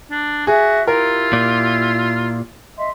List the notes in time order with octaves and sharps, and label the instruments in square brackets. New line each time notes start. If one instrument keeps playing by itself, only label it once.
[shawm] D4
[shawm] F#4 [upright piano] G#4 [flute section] E5
[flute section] E4 G4 [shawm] F4 [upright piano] A#4
[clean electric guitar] A#2
[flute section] D#5 E5 C6